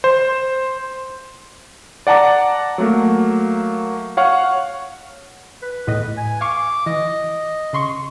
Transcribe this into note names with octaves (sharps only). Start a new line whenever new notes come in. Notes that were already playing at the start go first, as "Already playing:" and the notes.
C5
D5 F#5 A5 A#5 D6
F#3 A3 A#3
C#5 F5 F#5 C#6 F6
B4
E2 A2 D#5
G#5
F5 C#6 D6
E3 D#5
C#3 C6 C#6